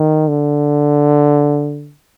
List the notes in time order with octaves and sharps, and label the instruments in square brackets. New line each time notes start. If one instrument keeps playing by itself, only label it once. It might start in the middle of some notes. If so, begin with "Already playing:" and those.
Already playing: [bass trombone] D#3
D3